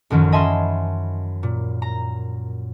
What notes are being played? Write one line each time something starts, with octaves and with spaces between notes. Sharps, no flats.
A1 F#2 D#3 F3
D#5 E5 G#5 A5 B5 C6
A#2
A#5